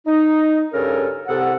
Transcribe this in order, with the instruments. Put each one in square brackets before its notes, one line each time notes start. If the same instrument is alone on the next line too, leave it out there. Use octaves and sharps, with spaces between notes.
[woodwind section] D#4
G2 C#3 C#4 A4 A#4
C2 A4 F#5